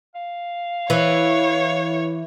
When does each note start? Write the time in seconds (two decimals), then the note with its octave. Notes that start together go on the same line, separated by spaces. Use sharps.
0.15 F5
0.90 E3 C#5